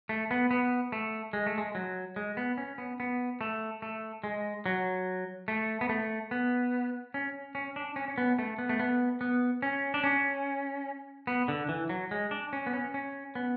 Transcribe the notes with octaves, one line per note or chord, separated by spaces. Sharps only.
A3
B3
B3
A3
G#3
A3
G#3
F#3
G#3
B3
C#4
B3
B3
A3
A3
G#3
F#3
A3
B3
A3
B3
C#4
C#4
D4
C#4
C#4
B3
A3
B3
A3
B3
B3
C#4
D4
C#4
B3
D3
E3
F#3
G#3
D4
C#4
B3
C#4
C#4
B3